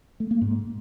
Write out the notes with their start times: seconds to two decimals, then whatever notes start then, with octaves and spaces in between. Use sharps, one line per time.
0.20 A3
0.31 A#3
0.41 G#2